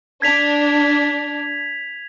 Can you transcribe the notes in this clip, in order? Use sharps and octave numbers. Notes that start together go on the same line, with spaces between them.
D4 G#6 B6 F7